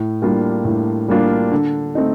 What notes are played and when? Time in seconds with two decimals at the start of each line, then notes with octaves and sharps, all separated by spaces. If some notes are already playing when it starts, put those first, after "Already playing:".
Already playing: A2
0.22 G3 A#3 D4 F4
0.64 A2
1.08 G3 A#3 D4 F4
1.52 D3
1.95 A3 C4 D#4